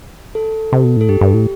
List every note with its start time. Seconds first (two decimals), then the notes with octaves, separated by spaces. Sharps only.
0.35 A4
0.73 C3
0.84 B2
0.97 A2 A4
1.09 G2 G4
1.21 G2
1.34 A2